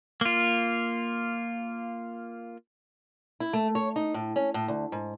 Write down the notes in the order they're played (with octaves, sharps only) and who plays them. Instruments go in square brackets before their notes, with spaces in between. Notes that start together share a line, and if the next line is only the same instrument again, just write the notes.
[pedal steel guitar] A#3 F4
[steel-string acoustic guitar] E4
A3
C#5
D#4
A2
C#4
A2
D2
G#2